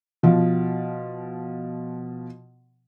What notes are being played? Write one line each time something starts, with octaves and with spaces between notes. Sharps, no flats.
B2 F3